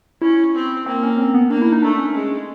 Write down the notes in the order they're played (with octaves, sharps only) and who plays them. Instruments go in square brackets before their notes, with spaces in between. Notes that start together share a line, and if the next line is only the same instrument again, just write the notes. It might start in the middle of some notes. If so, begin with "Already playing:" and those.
[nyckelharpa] C#4 [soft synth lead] E4
[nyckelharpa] C4
[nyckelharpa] A#3 [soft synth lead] C4
[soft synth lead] C#4
C4
B3
[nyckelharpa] A#3 [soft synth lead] D4
[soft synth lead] E4
D#4
[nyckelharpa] A3 [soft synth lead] D4
[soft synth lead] C#4
[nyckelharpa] G#3